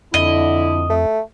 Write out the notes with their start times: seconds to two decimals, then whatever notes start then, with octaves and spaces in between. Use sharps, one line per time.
0.14 F2 D3 E4 D#5
0.90 A3